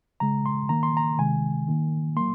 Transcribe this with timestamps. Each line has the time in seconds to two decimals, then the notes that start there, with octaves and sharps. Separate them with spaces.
0.20 C#3 G#3 A#5
0.46 C6
0.69 D#3 A#3 A#5
0.83 C6
0.97 A#5
1.18 C3 D#3 G#3 G#5
1.68 D#3 A#3
2.16 F#3 A#3 C6